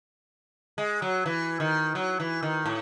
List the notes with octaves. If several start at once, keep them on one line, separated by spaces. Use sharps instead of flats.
G#3
F#3
E3
D#3
F#3
E3
D#3
A2